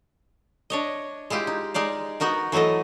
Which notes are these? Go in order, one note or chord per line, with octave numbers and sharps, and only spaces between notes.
D4 C#5 D#5
G#3 E4 F4 G4
D#4
G#3 D#4 D5 F5
B3 D#4 F#4 A#4
E3 F#3 A3 A4 D#5